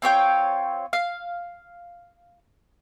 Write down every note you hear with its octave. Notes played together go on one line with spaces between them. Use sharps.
C4 F4 C#5 G5
F5